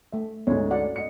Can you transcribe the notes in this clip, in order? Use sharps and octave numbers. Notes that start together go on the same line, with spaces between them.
A3 E5
D2 G#2 C#4 C#5
F#4 D5 F#5
D#5 C#7